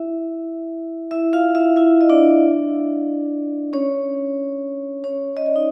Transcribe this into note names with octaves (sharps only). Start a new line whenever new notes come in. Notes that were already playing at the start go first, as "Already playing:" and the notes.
Already playing: E4 E5
E4 E5
F4 F5
E4 E5
E4 E5
D#5
D4 D5
C#4 C#5
C#4 C#5
D#5
D5
D#4